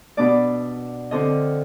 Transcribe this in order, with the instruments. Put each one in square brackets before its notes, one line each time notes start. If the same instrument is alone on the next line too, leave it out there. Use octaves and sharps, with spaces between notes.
[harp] B2 B3 D4 D5
D3 F3 C4 D#5